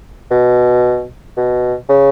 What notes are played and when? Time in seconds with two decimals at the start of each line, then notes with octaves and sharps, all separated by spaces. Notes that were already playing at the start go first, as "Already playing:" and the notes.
0.31 B2
1.37 B2
1.89 C#3